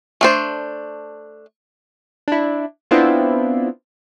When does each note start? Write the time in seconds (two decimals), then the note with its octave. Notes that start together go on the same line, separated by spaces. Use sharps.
0.21 A3 D4 C5
2.28 D4 E4
2.91 B3 C4 D4 E4 F4